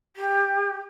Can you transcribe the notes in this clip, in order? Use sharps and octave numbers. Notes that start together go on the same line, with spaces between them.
G4